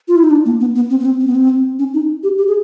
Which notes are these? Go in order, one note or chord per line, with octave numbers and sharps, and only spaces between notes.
F4
E4
D#4
D4
A#3
B3
B3
C4
B3
C4
C4
B3
C4
C#4
D#4
G4
G4
G#4